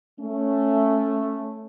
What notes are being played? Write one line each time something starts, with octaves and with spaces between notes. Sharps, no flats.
A3 C#4